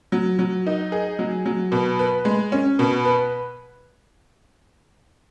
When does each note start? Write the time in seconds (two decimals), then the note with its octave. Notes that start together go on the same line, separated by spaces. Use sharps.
0.12 F#3
0.39 F#3
0.67 D#4
0.92 G#4
1.19 F#3
1.46 F#3
1.72 B2
1.99 B4
2.25 G#3
2.52 C#4
2.79 B2
3.05 B4